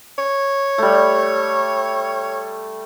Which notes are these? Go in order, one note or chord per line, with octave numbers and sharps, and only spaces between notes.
C#5
G3 A3